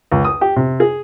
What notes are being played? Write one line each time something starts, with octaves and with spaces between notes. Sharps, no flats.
C#2
D#6
G4
C3
G#4